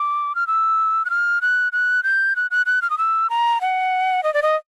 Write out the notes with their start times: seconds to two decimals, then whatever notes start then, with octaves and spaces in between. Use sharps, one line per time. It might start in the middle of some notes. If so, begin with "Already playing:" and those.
Already playing: D6
0.35 F6
0.47 E6
1.05 F#6
1.10 F6
1.42 F#6
1.72 F#6
2.03 G6
2.36 F#6
2.51 F#6
2.66 F#6
2.82 F6
2.90 D#6
2.98 E6
3.30 A#5
3.61 F#5
4.24 D#5
4.34 D5
4.42 D#5